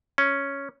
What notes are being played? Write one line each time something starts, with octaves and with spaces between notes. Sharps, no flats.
C#4